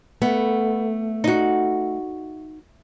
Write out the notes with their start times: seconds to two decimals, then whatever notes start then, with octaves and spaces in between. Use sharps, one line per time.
0.22 A3 B3
1.24 D#4 F#4